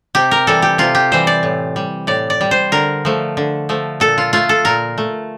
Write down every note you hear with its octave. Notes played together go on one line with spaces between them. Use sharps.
C3 G4
A#4
E3 G3 A4
G4
C3 F4
G4
E3 G3 C5
D5
A2
G3
A2 D5
D5
G3
C5
D3 A#4
F3 A3
D3
F3 A3
A#2 A4
F4
A3 F4
A4
A#2 A#4
A3